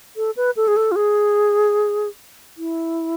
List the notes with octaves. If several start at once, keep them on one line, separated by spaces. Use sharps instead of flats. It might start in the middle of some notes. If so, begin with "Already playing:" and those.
A4
B4
A4
G#4
A4
F4
G#4
E4